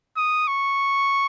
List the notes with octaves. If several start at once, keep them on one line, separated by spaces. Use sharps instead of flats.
D#6
C#6